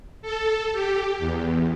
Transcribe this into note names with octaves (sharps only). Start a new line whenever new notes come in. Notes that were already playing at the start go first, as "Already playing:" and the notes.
A4
G4
E2